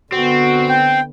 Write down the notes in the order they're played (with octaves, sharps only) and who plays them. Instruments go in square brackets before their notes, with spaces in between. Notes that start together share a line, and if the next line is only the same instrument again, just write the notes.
[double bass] D3 B3 [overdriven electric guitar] C4 [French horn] F#4
[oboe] G5